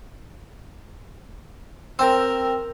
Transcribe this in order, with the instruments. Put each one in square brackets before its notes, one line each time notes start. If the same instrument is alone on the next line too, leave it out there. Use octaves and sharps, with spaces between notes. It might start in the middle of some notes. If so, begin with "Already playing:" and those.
[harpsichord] C4 [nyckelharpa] A#4 [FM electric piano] G5 E6